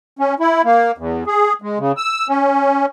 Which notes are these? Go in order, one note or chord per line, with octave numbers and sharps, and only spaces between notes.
C#4
E4
A#3
E2
G#4
G#3
C#3
E6
C#4